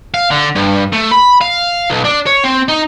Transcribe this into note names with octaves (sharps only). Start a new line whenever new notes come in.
F5
D3
G2
A3
B5
F5
B1
D4
C#5
C4
D#4